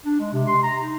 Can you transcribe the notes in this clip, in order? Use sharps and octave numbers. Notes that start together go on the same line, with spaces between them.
D4
G#3
C3
C6
A#5
D#4